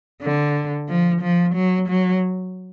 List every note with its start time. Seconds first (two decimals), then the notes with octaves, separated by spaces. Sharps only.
0.22 D3
0.88 F3
1.22 F3
1.55 F#3
1.89 F#3